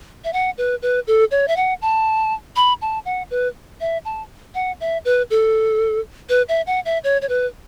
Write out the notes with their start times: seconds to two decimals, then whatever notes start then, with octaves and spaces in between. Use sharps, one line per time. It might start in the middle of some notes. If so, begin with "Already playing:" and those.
0.24 E5
0.33 F#5
0.58 B4
0.82 B4
1.07 A4
1.31 C#5
1.48 E5
1.56 F#5
1.82 A5
2.56 B5
2.82 A5
3.05 F#5
3.31 B4
3.81 E5
4.05 A5
4.55 F#5
4.80 E5
5.05 B4
5.30 A4
6.29 B4
6.49 E5
6.67 F#5
6.85 E5
7.04 C#5
7.22 C#5
7.29 B4